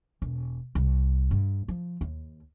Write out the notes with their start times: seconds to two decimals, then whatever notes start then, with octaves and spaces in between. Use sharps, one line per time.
0.22 E1
0.75 C2
1.31 G2
1.68 F3
2.01 D#2